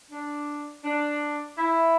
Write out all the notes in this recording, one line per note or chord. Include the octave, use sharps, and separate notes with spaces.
D4
D4
E4